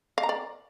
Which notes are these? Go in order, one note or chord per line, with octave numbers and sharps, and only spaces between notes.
F5
A#5
D5